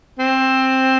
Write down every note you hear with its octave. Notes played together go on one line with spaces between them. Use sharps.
C4